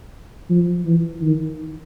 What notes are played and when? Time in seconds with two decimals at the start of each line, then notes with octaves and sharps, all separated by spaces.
0.50 F3
0.85 E3
1.22 D#3